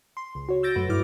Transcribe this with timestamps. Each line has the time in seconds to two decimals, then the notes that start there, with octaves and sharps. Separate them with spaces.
0.17 C6
0.35 C#2
0.49 F#4 C#5
0.63 E6 G6 A6 A#6 D7
0.75 F#2 A3 F#4 B4
0.89 G2 E4 D6 F6